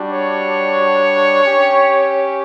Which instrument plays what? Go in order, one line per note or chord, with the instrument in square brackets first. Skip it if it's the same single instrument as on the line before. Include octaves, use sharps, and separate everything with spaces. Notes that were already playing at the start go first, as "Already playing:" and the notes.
Already playing: [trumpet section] G3 D4 F#4
C#5
C#4 G4